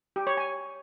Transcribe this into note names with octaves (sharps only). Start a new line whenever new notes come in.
G4
C#5
G#5